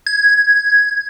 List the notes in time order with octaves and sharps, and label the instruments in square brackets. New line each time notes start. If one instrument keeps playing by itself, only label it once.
[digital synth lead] G#6